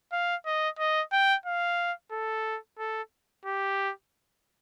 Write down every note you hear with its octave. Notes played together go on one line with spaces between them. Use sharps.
F5
D#5
D#5
G5
F5
A4
A4
G4